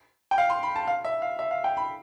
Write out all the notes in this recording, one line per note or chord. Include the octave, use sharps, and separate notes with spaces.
G5
F5
C6
B5
A5
F5
E5
F5
E5
F5
G5
B5